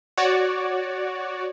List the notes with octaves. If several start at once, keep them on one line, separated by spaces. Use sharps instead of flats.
F#4 C#5 D5